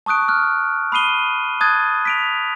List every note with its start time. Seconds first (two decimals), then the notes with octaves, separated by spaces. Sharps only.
0.06 A5 C#6 D#6 F#6 D7
0.28 F6 F#6
0.92 B5 D#6 C7 D#7 G7
1.61 A5 D#6 F#6 G#6 A6
2.05 B6 D7 F7